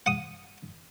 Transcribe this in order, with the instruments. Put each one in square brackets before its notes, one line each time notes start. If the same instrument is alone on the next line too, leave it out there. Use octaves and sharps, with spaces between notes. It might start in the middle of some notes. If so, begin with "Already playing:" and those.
[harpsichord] F#5 D#6